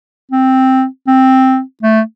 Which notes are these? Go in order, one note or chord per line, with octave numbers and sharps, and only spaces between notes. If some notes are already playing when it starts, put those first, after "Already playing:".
C4
C4
A3